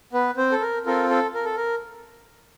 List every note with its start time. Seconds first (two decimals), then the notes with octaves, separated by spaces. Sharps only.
0.13 B3 B4
0.37 C4 C5
0.52 A4
0.61 A#4
0.86 C4 F4 A4 A#4
1.10 A4
1.34 A#4
1.45 A4
1.56 A#4